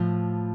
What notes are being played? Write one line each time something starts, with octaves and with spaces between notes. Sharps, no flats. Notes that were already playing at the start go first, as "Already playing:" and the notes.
Already playing: A2 F3